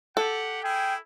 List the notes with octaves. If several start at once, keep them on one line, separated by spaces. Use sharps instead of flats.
G4 A4 F#5
E4 G#4 G5